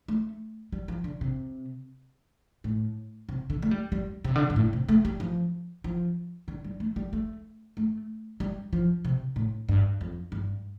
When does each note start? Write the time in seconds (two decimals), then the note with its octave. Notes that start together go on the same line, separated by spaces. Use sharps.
0.08 A3
0.72 G3
0.88 F3
1.04 D3
1.21 C3
2.64 A2
3.29 C3
3.50 D3
3.62 A3
3.71 G3
3.92 G3
4.24 C3
4.36 D3
4.50 G2
4.56 A2
4.73 C3
4.89 A3
5.05 G3
5.20 F3
5.84 F3
6.48 D3
6.64 G3
6.80 A3
6.96 G3
7.13 A3
7.77 A3
8.40 G3
8.73 F3
9.05 C3
9.36 A2
9.69 G2
10.01 F2
10.32 G2